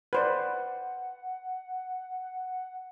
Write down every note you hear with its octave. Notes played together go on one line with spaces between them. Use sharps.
B4 C5 D5 F#5